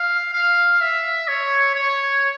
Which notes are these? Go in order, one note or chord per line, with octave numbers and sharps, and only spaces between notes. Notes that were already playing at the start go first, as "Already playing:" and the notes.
Already playing: F5
F5
E5
C#5
C#5